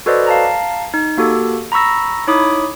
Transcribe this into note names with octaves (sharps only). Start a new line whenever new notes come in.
F#4 A4 B4 C5 D5 D#5
F5 A5 A#5
D#4
A#3 F#4 G4 A4
A#5 B5 C#6 E6 A#6
D#4 E4 C#5 B5 D6 D#6